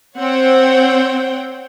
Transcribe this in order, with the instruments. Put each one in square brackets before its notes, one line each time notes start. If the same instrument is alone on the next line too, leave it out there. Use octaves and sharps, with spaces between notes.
[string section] C4 C5 C#5 F#5 G5